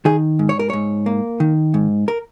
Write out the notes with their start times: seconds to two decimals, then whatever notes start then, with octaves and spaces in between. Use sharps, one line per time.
0.05 D#3 G#4
0.39 G#2
0.49 C#5
0.59 A#4
0.70 G#2 C#5
1.06 A#3
1.40 D#3
1.74 G#2
2.08 A#4